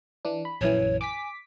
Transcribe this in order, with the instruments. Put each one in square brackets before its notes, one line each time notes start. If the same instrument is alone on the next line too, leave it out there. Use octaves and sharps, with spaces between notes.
[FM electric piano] E3 D4
B5
[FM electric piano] A#1 F#2 E3 [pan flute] C#5
[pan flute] G#5 [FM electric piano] D6 B6